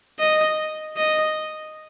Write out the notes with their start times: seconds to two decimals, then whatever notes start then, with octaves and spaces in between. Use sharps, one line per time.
0.19 D#5
0.97 D#5